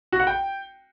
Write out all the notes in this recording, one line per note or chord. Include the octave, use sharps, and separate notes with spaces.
F#4
F#5
G5